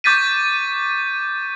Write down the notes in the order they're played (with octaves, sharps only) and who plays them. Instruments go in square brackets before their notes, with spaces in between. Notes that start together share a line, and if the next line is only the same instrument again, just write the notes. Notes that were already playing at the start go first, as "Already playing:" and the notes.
[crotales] C#6 D6 G6 A6 B6 D#7